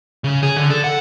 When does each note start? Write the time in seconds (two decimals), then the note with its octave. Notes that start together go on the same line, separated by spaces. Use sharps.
0.24 C#3
0.43 G#4
0.56 D3
0.70 A4
0.84 F#5